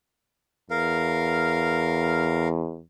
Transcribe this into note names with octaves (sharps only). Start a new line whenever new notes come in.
E2 A#4 F5